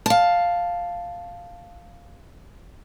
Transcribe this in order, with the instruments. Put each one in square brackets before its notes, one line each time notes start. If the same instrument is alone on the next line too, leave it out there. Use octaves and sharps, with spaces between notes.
[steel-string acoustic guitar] F5 A5